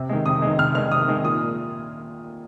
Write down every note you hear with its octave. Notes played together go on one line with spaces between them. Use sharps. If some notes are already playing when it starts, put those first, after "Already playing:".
Already playing: C3
D#3 G#3
C3 D#6
D#3 G#3
C3 F6
D#3 G#3 F6
C3 D#6
D#3 G#3
A#2 D#6